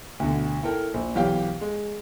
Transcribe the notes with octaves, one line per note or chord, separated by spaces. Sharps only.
D2 B2 D3
E4 A4 A#4 G5
A#1
B1 E3 F#3 G4 F5 G5
G#3